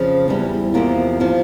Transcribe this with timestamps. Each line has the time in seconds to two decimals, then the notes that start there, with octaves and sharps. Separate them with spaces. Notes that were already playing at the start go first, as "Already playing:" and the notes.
Already playing: F2 C#3 F3
0.28 E2 E3 G3
0.74 E2 C3 F3 A#3
1.20 C3 F3